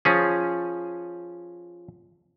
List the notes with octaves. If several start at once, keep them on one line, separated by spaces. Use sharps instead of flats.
F3 C#4 G#4